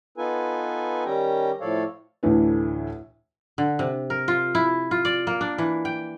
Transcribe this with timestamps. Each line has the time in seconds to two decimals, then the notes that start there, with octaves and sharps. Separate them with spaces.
0.18 B3 D#4 F4 A4 B4 G#5
1.05 D#3 G3 C#4 G4 G5 A#5
1.61 A2 F3 A4 C#5 D5 F5
2.23 D2 A2 E3 D4 B4
3.58 D3
3.79 C3
4.10 A#4
4.28 F4
4.55 E4
4.91 F4
5.05 D5
5.27 A#3
5.41 D4
5.58 E3
5.85 G5